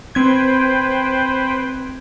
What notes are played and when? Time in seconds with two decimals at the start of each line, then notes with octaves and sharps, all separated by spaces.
0.15 C4 B4 C5 G5 G#6